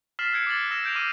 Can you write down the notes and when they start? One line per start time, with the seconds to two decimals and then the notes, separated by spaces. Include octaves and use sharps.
0.19 F6 A6 B6 C7 E7 F#7
0.32 E6 F#6 G#6 C#7 D7 E7
0.47 D6 G#6 A6 F#7
0.71 E6 A#6 E7
0.84 F#6 G6 D7 F7
0.95 D6 F6 D#7 F#7